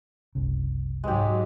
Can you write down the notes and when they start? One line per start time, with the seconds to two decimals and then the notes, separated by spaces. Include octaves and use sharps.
0.35 F#1 C2 C#3
1.04 G#2 F#3 G#3 G4